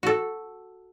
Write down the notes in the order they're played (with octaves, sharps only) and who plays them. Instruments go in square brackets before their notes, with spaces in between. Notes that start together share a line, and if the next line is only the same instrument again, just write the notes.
[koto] F#4 A4